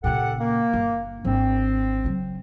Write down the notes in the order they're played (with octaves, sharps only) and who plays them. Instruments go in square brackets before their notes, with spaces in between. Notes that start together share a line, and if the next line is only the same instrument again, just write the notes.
[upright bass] A#2 C#3 [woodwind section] G4 A4 F#5
[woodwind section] A#3
[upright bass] G1
[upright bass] G#1 D4 [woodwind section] C4
[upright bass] C#3 F#3